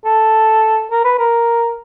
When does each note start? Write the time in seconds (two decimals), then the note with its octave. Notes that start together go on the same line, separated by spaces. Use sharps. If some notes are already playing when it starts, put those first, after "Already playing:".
0.05 A4
0.91 A#4
1.04 B4
1.19 A#4